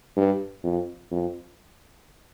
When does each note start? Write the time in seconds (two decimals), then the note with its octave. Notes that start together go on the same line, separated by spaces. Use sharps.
0.17 G2
0.64 F2
1.11 F2